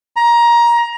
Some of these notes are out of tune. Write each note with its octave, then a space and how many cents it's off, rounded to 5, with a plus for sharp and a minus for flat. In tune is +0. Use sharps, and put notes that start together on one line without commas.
A#5 +20